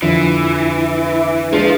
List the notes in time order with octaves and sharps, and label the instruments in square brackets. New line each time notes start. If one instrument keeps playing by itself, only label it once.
[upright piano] F2 D3 F3 [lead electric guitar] E3
[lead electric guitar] F3 [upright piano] G#3 D4 G#4 B4